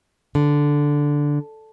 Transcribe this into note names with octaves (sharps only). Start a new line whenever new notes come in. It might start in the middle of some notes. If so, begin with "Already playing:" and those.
D3